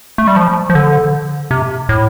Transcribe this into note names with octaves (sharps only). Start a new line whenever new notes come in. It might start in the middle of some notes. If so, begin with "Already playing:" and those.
A3
G3
F3
F3
D3
C3
A2